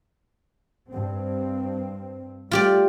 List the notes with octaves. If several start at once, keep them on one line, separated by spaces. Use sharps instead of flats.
G2 C4
G3 A3 F4 G4 D5